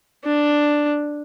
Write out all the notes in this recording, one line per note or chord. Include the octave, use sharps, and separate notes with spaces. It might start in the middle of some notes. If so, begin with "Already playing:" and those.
D4